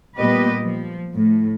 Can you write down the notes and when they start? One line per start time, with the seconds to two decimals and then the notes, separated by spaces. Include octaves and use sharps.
0.16 A#2 G3 B3 G4 B4 D#5
0.63 F3
1.14 A2